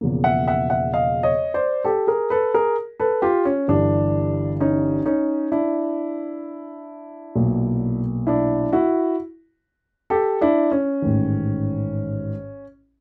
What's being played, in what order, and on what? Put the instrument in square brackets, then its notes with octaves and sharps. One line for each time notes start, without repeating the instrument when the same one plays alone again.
[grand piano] E1 E2 C#3 F3 A#3
E5 F#5
E5 F#5
E5 F#5
D#5 F5
C#5 D#5
C5 D5
G4 A4
G#4 A#4
A4 B4
G#4 A#4
A4 B4
F4 G4
C#4
G1 G2 E3 D4
C#4 D#4
C#4 D#4
D4 E4
B1 A#2 F#3 A#3
D4 E4
E4 F#4
G4 A4
D4 E4
C#4
A1 G#2 D#3